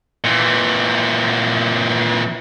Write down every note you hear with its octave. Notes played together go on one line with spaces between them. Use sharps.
A#2 E3